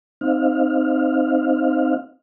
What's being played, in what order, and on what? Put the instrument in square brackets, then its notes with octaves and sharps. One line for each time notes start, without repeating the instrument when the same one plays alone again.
[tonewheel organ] C4 D#4 F5